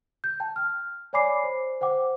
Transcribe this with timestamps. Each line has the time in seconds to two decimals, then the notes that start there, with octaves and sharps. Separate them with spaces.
0.24 G6
0.40 G5 A5
0.56 F6
1.13 C#5 D5 G#5 B5 D6 C7
1.44 C5
1.81 C5 F#5 G5 D6